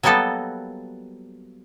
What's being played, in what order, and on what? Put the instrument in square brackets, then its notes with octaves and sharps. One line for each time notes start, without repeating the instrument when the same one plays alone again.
[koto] F#3 G3 A#3 B3 A4 D#5